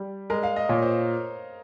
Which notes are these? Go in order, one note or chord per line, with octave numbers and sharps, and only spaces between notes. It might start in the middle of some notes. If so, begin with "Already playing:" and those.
Already playing: G3
G#3 A#4
F5
D#5
A#2 C#5
C5